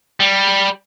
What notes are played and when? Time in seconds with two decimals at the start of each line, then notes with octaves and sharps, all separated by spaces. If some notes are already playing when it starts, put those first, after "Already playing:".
0.20 G3